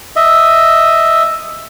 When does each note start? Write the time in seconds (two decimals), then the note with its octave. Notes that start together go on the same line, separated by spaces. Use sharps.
0.16 D#5 E5